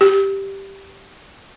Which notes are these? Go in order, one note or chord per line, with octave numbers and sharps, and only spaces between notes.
G4